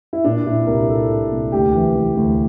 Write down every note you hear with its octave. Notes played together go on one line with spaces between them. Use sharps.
E4
A#2 D4
A#2 E4
C2 A#4
A#2 A4
A#2
C2
D2 G4
E3
E3
D2